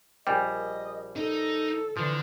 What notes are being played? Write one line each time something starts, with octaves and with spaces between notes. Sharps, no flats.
A#1 G3 D#5 G5 G#5
D#4 A4
D3 E3 F3